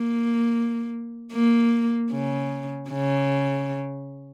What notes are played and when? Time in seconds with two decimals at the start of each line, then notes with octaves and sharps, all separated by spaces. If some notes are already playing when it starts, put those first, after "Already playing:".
Already playing: A#3
1.33 A#3
2.12 C#3
2.91 C#3